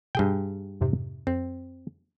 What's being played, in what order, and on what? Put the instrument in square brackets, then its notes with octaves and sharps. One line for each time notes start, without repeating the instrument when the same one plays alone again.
[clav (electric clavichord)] G2 G#4 G5 [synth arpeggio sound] B2
[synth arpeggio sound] F2 G#2 C3
[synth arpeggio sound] F2 [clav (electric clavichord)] C4